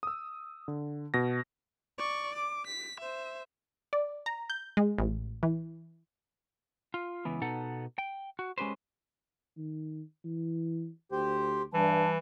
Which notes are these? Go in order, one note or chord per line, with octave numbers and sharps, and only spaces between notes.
D#6 E6
D3
B2 A#6
D5 C#6
D6
B6
C5 E5
D5
A#5
G6
G#3
A1
E3
F4
C#2 E3 B3
B2 B3 D#4 A4 F#5
G5
F#4
G#3 C#4 G4 B4 C5
D#3
E3
D2 G4 C5
G2 E3 G3 A5